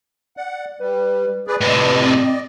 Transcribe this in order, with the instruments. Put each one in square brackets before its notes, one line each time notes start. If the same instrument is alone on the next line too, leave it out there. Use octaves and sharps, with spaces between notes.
[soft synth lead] D5 [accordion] F#5
[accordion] G3 [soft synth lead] B4
[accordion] G#4 B4 D5
[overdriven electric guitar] A2 C3 [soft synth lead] B4 [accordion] D5 D#5
[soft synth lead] C4